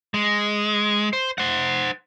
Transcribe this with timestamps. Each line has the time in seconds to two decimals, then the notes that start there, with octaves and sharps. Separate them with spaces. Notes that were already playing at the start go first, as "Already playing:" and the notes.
0.14 G#3
1.13 C5
1.38 C5 F#5